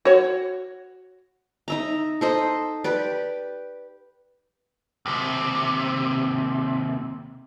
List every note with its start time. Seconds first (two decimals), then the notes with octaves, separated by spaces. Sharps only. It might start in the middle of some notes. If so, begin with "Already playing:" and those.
0.05 F#4 C#5
1.68 D#4 E5 A#5
2.21 A4 C5 D#5
2.84 G4 B4 D5
5.06 D#2 C3